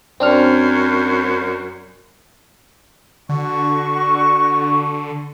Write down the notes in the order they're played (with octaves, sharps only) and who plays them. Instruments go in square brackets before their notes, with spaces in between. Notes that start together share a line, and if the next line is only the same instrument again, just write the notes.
[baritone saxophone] F#2 [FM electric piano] C4 D4 F6
[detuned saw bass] D3 [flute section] F#4 C#6